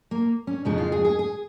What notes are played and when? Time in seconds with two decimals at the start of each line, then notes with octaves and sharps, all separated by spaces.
0.11 A#3
0.47 C#4
0.65 F2 C#3 F3 G#3 D#4
0.78 F4
0.92 G#4
1.05 G#4
1.19 G#4